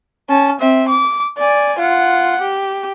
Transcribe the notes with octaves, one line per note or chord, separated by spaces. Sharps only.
C#4 A5
C4 E5
D6
D5 G#5
F4 F#5
G4